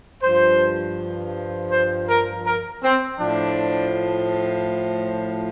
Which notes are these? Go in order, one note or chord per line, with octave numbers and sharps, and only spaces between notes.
G2 F3 C5
C5
A#4
A#4
C4
A2 F3 D4